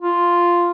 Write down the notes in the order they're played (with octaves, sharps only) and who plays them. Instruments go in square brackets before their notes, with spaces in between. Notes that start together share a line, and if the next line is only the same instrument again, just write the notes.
[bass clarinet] F4